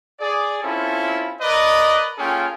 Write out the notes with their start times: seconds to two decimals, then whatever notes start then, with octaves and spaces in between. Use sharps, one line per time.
0.20 G#4 D5
0.63 C4 C#4 E4 F4 A4
1.41 A#4 B4 D5 D#5
2.18 A#3 C#4 F4 G#4 A4 G5